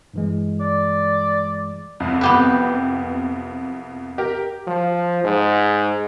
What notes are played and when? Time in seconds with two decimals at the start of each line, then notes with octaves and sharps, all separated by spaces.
0.14 G2 E3 G#3
0.60 D5
2.00 C2 F2
2.21 B3 G4 B4
4.18 G4 A#4
4.67 F3
5.24 G#2